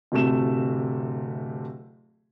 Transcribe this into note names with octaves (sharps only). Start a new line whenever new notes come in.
D1 C3 A3 E7